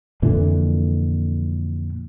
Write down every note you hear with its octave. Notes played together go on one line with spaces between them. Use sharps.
F2 A#2 D3 E3